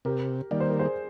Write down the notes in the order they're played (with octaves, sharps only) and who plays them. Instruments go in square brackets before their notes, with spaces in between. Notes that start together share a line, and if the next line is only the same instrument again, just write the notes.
[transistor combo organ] C3 [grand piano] G4 A#4
[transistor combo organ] D#3 G3 A#3 [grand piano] D5
[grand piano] C5
A#4
G#4 C5